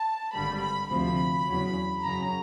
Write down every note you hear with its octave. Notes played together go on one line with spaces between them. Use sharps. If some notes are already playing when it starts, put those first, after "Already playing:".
Already playing: A5
G#1 G2 D3 G3 B5
B5
D2 C3 F3 B5
E2 C#3 F#3
F#2 C#3 F#3 A#5